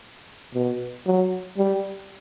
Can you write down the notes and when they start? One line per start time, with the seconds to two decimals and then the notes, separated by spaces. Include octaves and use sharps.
0.54 B2
1.07 F#3
1.57 G3